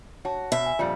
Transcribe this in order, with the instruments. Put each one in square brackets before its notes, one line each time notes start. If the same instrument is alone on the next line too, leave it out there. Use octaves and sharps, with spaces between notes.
[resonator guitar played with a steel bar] F#4 [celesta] C#5 A5
[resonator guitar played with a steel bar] B2 [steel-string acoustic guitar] E5
[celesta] G#5
[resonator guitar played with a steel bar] F2 A#2 G3 [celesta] F4 D5 C#7